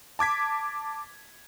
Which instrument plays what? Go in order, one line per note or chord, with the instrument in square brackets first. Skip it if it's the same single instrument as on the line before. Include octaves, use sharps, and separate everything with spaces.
[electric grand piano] A5 D6 G#6 B6